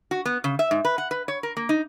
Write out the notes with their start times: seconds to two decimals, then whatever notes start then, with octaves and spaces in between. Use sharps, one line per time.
0.11 F#4
0.26 B3
0.44 C#3
0.59 E5
0.71 G#2
0.85 B4
0.98 F#5
1.11 B4
1.28 C#5
1.43 A#4
1.57 A#3
1.69 D#4